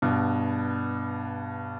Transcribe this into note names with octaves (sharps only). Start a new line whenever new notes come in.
G2 B2